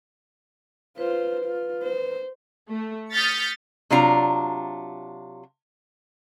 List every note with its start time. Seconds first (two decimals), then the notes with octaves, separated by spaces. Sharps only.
0.98 F4 B4 C5
1.45 F4
1.83 C5
2.69 A3
3.12 D#6 F6 G6 A6 B6 C#7
3.90 C3 F#3 D4 F4 A#5